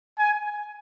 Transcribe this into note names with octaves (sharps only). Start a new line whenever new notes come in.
G#5